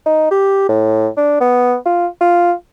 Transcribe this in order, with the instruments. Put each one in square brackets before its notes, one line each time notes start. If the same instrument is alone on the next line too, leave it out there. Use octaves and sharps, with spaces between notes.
[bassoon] D#4
G4
A2
D4
B3
F4
F4